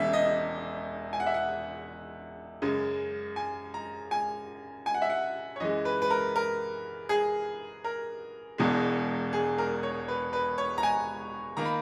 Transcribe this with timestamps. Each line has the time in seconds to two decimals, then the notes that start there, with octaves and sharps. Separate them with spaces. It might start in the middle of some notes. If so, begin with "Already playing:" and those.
Already playing: E1 E2 C#3 E5
0.13 D#5
1.13 G#5
1.20 F#5
1.27 E5
1.34 F#5
2.62 F#2 C#3 G#3
3.36 G#5
3.74 A#5
4.11 G#5
4.86 G#5
4.94 F#5
5.02 E5
5.10 F#5
5.56 C#5
5.60 F#2 E3 G#3 D#5
5.85 B4
6.02 B4
6.10 A#4
6.36 A#4
7.09 G#4
7.84 A#4
8.58 E1 E2 B2 G#3
9.33 G#4
9.58 A#4
9.83 C#5
10.08 B4
10.33 B4
10.58 C#5
10.78 A#5
10.83 G#5
11.57 D#3 A#3 A#5
11.65 B5